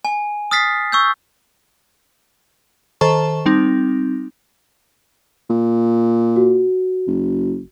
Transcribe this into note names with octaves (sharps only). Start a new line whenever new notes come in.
G#5
D#6 F6 A6 B6 C7
C#6 E6 G6
D#3 A4 C5 A5 C#6
G3 C4 D#4
A#2
F#4
F#1